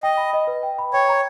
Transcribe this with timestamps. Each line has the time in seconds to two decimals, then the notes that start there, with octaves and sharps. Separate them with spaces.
0.03 D#5 G5
0.17 B5
0.33 D#5
0.47 B4
0.63 G5
0.78 B5
0.94 C#5 G5
1.09 A#5